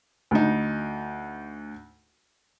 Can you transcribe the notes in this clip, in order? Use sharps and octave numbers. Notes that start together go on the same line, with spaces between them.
D2 D#4